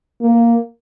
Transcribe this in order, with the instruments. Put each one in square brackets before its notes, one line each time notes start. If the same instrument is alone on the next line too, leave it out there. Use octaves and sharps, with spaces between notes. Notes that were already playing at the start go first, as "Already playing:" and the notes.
[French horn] A#3